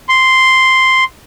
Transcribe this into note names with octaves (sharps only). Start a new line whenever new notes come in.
C6